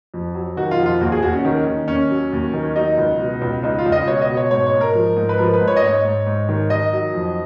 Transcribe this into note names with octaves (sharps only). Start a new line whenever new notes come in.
F2
F#3
D#3 F#4
F4
F2
F4
D#2 F#4
G#4
D#2 F#4
C#4
D#3
D#3
D#2 C#4
F#3
D#2
D#3
F#3 D#4
C#2
B2
C#2
C#2 D#4
F4
C#2
D#5
B2 C#5
D#5
B2
C#5
G#2 C#5
C#5
G#2
A#4
F3
G#2
B4
F3 A#4
B4
G#2
C#5
D#5
G#2 C#5
G#2
G#2
D#3
D#3 D#5
F#3
F2